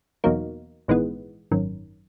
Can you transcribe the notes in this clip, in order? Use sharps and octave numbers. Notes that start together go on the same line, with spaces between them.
E2 B2 F#3 A#3 D#4
A#1 G#2 E3 G#3 B3
G#1 F#2 D#3